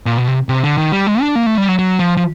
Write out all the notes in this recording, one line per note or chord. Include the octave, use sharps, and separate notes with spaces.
A#2
B2
C3
C3
D3
D#3
G3
G#3
D4
A#3
A3
G3
F#3
F#3
F3
F3